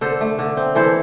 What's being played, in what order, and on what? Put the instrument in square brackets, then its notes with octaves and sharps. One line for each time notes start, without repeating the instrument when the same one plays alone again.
[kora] D3 A4 C5
A3
D3
C4
E3 A4 C5